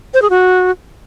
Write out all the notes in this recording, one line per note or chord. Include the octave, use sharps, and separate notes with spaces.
C5
G#4
F#4